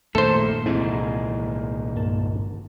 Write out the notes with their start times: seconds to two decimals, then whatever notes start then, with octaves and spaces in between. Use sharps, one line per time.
0.15 A#1 F#2 A#2 D#3 A3 A4 C5
0.66 C2 G#2 C3 E3 E4
1.95 G1 A#3 A5